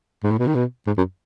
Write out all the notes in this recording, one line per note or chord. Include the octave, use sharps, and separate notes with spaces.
G#2
A2
B2
D#3
B2
G#2
F#2